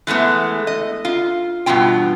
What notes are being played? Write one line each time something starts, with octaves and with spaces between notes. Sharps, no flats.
E3 G#3 A3 B3
D#5
F4
G2 B2 E3 F4 G5